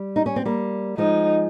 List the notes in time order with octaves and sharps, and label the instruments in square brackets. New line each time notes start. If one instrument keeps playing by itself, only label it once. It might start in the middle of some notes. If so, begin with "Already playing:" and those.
Already playing: [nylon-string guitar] G3
D#4
C#4
C4
G3 A#3
[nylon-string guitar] F3 G#3 [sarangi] D#4